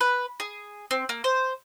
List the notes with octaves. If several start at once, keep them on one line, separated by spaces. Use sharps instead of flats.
B4
G#4
C4
A#3
C5